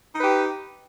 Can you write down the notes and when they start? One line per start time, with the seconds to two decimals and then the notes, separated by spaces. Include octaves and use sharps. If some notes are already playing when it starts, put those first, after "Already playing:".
0.14 D#4
0.19 B4
0.24 G4